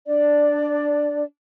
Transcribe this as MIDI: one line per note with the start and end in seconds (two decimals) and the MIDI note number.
0.07 1.23 62
0.07 1.23 74